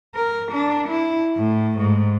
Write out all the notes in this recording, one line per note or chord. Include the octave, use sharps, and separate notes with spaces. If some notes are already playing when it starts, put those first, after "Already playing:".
A#4
D4
E4
A2
G#2